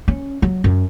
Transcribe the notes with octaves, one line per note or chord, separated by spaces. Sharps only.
C#4
F#3
F#2